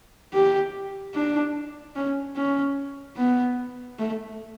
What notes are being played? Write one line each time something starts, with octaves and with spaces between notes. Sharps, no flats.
G4
D4
C#4
C#4
B3
A3